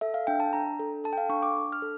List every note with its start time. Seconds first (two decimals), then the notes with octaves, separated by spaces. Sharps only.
0.01 A4 E5
0.14 F5
0.27 D4 G5
0.40 A5
0.53 D4 A#5
0.80 A4
1.04 A4 A5
1.13 G5
1.17 F5
1.30 D4 C#6
1.43 D6
1.57 D4
1.72 F6
1.82 A4